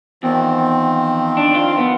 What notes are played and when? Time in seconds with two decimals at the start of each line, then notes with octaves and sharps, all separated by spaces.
0.23 E2 D#3 F3 C4
1.37 D4
1.55 F4
1.78 B3